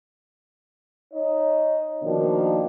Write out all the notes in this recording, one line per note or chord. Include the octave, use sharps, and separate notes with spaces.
D#4 C#5 D#5
B2 D#3 F3 A#3 D4